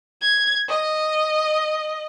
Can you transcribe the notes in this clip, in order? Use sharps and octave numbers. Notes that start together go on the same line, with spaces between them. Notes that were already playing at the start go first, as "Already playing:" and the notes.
G#6
D#5